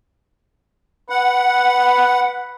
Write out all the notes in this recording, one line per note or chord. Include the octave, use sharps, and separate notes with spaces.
B4 F#5